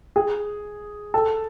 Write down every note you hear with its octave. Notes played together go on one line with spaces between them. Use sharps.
G#4
A4